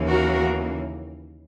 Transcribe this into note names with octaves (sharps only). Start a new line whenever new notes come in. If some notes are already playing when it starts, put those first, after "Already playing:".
Already playing: D#2 C#3 E3 A#3
F#4 A#4